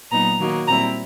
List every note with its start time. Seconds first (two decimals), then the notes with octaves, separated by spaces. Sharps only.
0.11 A#2 F#3 B3 D#4 A#5
0.40 D#3 F#3 A#3 D#4
0.68 A#2 G3 C4 E4 A#5